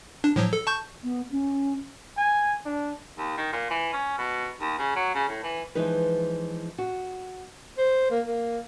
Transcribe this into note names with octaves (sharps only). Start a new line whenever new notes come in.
D4
A2 F3 F#3
A4
A5 C#6 G6
B3
C#4
G#5
D4
D#2
D#3
A#2
E3
C#4
B2
D#2
C#3
F#3
C#3
A2
E3
E3 F3 G#3 D#4 B4
F#4
C5
A#3
A#3